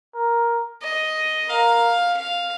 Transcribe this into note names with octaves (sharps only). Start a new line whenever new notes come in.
A#4
D#5
A#4 F5
F5